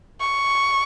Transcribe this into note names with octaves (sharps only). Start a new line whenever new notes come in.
C#6